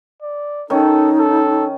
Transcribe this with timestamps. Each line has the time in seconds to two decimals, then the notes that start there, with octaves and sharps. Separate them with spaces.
0.22 D5
0.70 D#3 C#4 D#4 A4
1.19 A4